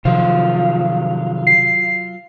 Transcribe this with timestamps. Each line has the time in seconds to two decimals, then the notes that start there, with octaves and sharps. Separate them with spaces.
0.05 C3 D#3 F3 F#3 F4
1.47 C7